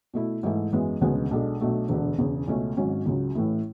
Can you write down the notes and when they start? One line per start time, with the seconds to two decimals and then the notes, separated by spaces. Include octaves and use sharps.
0.14 B2 A3 E4
0.43 G#2 E3 A3 E4
0.72 F#2 E3 G#3 B3
1.01 E1 D2 C#3 G#3 B3
1.31 B1 B2 G#3 D4 A4
1.60 B1 B2 F#3 A3 D4
1.89 E1 D2 D3
2.18 E1 E2 C#3
2.48 C#2 B2 A3 C#4
2.77 G#1 G#2 F#3 C#4
3.06 C#2 C#3 F#3
3.35 A1 A2 E3 A3 E4